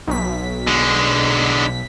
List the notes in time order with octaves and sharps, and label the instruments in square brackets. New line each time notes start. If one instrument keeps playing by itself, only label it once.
[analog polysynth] B1 B6
[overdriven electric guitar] D3 G#3